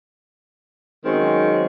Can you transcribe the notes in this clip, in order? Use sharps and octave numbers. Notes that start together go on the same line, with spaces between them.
D#3 F#3 G#3 C4 C#4